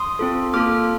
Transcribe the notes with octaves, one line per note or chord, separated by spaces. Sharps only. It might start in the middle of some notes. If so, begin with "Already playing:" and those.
Already playing: C6 D#6
C4 F4 A4
A#3 F4 A4 D6 F6